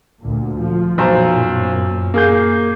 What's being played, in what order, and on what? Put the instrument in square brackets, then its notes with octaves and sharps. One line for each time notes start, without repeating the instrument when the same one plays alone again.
[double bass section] D2 A#2
F3
[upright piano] B1 C5 A#5 [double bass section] F#2 A#2
[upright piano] A#3 G#4 G6